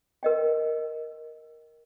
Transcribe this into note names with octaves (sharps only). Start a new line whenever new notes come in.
A#4 D#5 G5